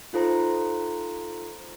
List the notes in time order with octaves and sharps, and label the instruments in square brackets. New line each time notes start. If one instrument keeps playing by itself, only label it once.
[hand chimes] D#4 F4 A4 C5 A#5